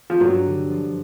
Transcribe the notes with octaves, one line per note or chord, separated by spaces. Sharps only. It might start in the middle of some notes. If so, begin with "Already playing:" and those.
F3
G2 F#3
D3
F3